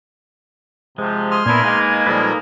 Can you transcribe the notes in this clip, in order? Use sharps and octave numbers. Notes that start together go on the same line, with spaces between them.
C3 F3 G#3
G#5 C6 D#6 F6
A#2 B3 D4 E4 A#4 G#6
G#3 A#3 D#4 B4
A#2 F3 G3 D#4 A4 B4